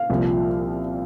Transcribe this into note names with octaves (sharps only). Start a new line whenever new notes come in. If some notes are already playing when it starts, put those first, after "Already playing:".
Already playing: F5
C2 A#2 F3